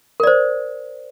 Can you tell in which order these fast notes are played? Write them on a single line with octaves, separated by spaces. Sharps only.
A#4 D5 C5